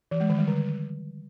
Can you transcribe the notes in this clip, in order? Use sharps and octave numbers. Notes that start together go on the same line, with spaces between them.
E3
G#3
D#3
G3
D3